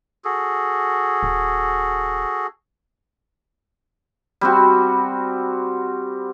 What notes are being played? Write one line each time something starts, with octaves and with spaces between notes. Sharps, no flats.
F#4 G#4 A4
D#1
G3 C4 F#4